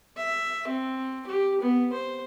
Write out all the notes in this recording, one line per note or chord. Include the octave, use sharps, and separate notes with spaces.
E5
C4
G4
B3
C5